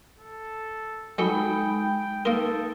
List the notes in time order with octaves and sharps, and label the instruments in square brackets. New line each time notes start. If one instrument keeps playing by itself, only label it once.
[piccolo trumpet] A4
[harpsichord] F#3 A4 [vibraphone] G#3 D#4 B5 [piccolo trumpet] G5
[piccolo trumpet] G5
[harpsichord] A#3 A#4 [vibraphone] D#4 [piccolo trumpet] A4